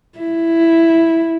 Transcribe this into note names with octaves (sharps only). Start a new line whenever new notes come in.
E4